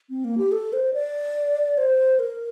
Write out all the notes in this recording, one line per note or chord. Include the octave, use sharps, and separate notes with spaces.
C4
A#3
G4
A4
C5
D5
C5
A#4